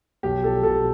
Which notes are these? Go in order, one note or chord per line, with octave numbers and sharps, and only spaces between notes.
B1 G4
F3 A4
B1 A4